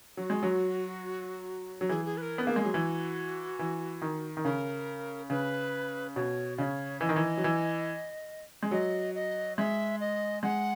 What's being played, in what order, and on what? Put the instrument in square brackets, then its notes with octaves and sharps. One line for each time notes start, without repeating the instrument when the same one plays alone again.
[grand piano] F#3 [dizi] F#4
[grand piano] G#3
F#3
F#3
[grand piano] E3 [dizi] G#4
[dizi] G#4
B4
A#4
[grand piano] B3
[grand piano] A#3 [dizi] G#4
[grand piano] G#3
F#3
[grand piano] E3 [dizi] F#4
[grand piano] E3
D#3
D#3
[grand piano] C#3 [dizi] A#4
[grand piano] C#3 [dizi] B4
[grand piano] B2 [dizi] C#5
[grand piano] C#3 [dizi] D#5
[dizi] C#5
[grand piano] E3 [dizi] D#5
[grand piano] D#3
E3
F#3
E3
G#3
[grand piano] F#3 [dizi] D#5
[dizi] D#5
[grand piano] G#3 [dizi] E5
[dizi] D#5
[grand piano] G#3 [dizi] F#5